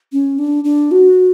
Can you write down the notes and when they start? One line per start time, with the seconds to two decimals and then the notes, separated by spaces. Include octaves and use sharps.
0.13 C#4
0.39 D4
0.64 D4
0.91 F#4